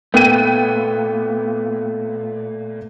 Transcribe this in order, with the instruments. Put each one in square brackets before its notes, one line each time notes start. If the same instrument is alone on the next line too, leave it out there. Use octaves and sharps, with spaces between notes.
[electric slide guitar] A#2 A3 [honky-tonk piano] B3 G5 D#7